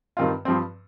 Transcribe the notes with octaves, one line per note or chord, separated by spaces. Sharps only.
G2 D#3 C4 F4
G2 F3 C4